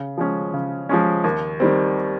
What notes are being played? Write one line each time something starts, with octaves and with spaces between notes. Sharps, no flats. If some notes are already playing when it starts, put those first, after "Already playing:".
Already playing: C#3
F3 G#3 C#4
C#3
F3 G#3 C#4
D#2
D#3 G3 C4